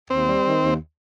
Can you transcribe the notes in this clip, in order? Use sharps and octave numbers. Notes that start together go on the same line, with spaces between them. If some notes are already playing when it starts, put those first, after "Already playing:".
D#2 C4
G3
D#3
D#2